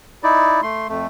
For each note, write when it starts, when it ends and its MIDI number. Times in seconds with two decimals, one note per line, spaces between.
0.23 0.61 63
0.23 0.61 64
0.23 0.61 74
0.62 0.87 57
0.62 0.87 84
0.89 1.07 41
0.89 1.07 57